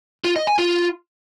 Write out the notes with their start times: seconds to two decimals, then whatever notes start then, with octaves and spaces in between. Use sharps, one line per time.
0.24 F4
0.36 D#5
0.47 G#5
0.59 F4